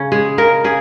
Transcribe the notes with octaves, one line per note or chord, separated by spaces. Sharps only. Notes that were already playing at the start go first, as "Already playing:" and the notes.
Already playing: C#3 C#4
G#3 G#4
C#3 A#4
C#3 G#4